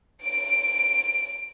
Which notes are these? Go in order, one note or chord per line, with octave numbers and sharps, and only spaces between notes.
D7